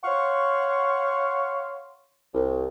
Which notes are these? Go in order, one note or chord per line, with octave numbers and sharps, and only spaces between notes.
C#5 F5 F#5 C6 C#6
C2